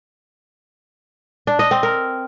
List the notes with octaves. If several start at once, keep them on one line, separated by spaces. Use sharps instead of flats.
D4
D#5
C4
A#4